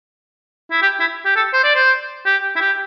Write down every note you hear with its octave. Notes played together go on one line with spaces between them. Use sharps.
E4
G4
E4
G4
A4
C5
D5
C5
G4
E4
G4